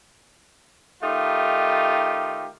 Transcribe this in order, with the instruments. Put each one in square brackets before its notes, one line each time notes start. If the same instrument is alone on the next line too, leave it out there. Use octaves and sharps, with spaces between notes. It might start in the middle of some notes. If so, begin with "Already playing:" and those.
[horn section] D#3 A3 D#4 F4 G4